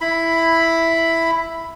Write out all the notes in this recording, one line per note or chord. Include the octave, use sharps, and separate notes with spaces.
E4 B5